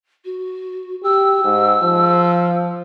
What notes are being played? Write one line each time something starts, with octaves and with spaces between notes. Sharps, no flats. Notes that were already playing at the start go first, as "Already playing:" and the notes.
F#4
G4 E6
G#2
F3